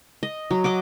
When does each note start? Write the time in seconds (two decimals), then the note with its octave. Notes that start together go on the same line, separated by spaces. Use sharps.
0.23 D#5
0.51 F#3
0.64 D#5 F#5 D6